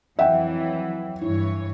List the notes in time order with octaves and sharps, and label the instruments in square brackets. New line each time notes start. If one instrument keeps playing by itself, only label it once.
[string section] F2 E3 F#3 [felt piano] E5 F#5 G5
[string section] G2 E3 C#5 [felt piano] E4